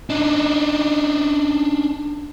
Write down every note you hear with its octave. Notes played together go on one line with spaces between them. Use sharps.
D4 D#4